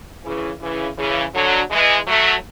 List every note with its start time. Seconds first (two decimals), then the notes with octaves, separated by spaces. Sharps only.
0.24 C#3 E3
0.61 C#3 E3
0.97 C#3 E3
1.34 D3 F#3
1.71 E3 G#3
2.07 F#3 A3